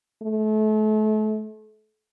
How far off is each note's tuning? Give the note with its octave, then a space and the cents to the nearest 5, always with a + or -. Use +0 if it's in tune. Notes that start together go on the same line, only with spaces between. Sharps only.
A3 -35